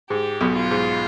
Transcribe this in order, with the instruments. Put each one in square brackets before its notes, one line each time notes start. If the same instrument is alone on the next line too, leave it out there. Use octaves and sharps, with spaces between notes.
[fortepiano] G#2 [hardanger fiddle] G4
[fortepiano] B1 B2
[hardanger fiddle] F4
[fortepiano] G#2